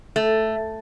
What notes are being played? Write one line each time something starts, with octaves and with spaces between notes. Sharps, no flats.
A3